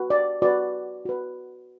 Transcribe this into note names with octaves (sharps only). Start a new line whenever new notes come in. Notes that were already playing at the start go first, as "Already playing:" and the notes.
Already playing: F#4 B4
D5
F#4 B4 D5
F#4 B4